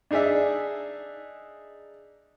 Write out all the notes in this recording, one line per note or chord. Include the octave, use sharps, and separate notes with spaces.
D4 D#4 G#4 D5 E5